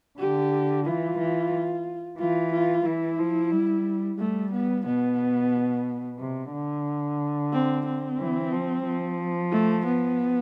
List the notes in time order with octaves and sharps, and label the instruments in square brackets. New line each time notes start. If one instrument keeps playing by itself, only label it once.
[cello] D3 [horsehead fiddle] G4
[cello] E3 [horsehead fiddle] F4
[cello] E3
[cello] E3 [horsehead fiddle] F4
[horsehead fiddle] F4
[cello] E3 [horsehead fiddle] E4
[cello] F3
G3
[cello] G3 [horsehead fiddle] A3
[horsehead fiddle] B3
[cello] B2 [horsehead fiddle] B3
[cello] C3
D3
[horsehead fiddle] C4
C4
[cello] E3
F3
F3
[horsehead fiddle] A3
B3